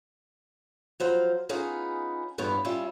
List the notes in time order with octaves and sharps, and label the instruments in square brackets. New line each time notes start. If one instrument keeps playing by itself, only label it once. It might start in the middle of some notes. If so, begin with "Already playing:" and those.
[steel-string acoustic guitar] F3 F#3 C5 F5
B3 C#4 D#4 F4 G#4
E2 G2 B3 F4 C#5
G3 C#4 F4 E5